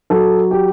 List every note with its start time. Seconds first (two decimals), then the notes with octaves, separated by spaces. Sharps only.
0.10 F#3 A4
0.51 G4